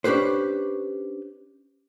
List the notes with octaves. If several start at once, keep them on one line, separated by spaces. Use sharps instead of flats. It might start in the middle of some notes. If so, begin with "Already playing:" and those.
C#4 D4 G4 B4 C5